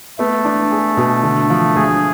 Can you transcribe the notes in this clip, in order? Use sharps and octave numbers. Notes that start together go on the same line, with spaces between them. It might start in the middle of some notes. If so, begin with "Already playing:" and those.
A3 B3
D4
G#4
B2
D3
F3
D2 G#4